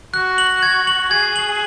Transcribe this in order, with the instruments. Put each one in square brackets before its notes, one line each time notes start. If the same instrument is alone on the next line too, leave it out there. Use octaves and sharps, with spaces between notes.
[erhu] F#4 [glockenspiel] F#6
[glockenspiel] F#7
G#6
F#7
[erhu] G#4 [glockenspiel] G#6
[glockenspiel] F#7